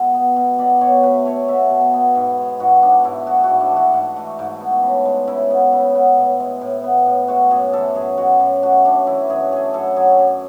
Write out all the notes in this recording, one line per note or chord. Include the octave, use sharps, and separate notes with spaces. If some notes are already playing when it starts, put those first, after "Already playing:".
Already playing: B2 G#3
B3
B2
B2 D5
B2 C#5
A3 B4
A3 C#5
B2 E5
B2
B3
G#2
G#3
G#2 F#4
B3 D4
G#2 E4
A3 F#4
F#4
G#2
D4
E3
F#4
G#2
A3
G#2
B3
C#3
G#3
C#3 E4
B3
C#3
B3
A2
G#3
A2
B3
A2
G#3 F#4
F#2 G#4
E3 A4
F#2 G#4
G#3 F#4
F#2
A3 F#4
F#2 D4
E3 E4
F#2 G#4
A3 G#4
F#2 A4
F#3 G#4
F#2